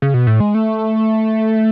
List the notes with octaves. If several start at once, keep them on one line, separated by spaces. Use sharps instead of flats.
C#3
B2
A2
G#3
A3